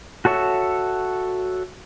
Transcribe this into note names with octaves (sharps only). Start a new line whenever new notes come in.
F#4 A4 C#5 E5